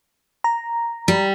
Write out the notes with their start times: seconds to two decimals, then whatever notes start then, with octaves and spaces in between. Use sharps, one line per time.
0.44 A#5
1.08 G3